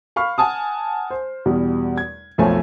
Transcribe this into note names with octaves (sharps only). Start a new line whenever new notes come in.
F5 B5 C#6 F6
F#5 G#5 A5 D#6
C5
E2 B2 G3
G#6
B1 F2 A3 C5 C#5 G#5